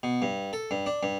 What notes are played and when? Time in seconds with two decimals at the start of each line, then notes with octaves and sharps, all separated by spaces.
0.03 B2
0.22 G2
0.53 A4
0.71 G2
0.86 D4
1.03 G2